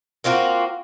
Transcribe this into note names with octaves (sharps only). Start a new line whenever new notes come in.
A#3 C4 F4 F#4